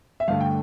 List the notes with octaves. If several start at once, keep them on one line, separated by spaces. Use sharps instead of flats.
E5
G2 D3 A3 F5
G5